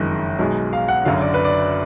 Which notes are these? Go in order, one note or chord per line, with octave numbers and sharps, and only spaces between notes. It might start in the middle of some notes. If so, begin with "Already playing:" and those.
Already playing: F#1 F2 D#3 G#3
B1 B2 G#3
F5
F#5
F#1 F#2 D3 F#3 F5
D5
B4
D5